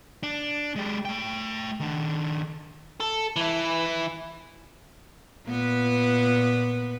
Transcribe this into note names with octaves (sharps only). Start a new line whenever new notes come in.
D4
G#3 G4
A3 G5
D#3 D4
A4
E3 E4
A#2 B3 B4